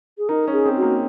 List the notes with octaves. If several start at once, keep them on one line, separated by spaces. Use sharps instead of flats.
G#4
D#4 A#4
C#4 G#4
C4
F#4
A#3